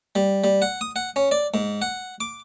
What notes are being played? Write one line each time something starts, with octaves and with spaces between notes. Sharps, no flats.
G3
G3
F#5
D#6
F#5
C#4
D5
G#2
F#5
D6